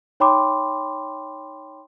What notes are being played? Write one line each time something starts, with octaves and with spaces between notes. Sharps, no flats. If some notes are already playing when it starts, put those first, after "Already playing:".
D#4 C#5 G5 B5 C6 D6